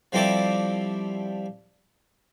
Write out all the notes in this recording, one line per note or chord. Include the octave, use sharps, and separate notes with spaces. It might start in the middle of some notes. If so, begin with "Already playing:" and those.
F3 G3 C4 E4 A4 D5